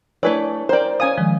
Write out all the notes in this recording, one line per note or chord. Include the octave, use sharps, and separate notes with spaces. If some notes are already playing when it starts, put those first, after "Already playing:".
A3 D4 E4 B4 C#5 D5 G#5
A#4 C5 D5 G5
C#4 F5 G#5 D#6
D#3 F3 G#3